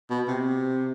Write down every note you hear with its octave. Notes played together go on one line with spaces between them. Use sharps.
B2
C3